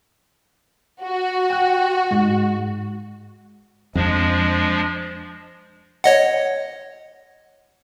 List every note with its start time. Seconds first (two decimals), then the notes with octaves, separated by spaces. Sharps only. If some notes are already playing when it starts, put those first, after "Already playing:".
1.02 F#4
1.50 G5 F#6
2.11 G#2 G#3
3.95 F2 F3 G#3 D4
6.04 C#5 D#5 F#5